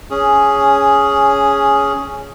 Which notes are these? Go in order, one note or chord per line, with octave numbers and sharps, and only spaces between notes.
C#4 G#4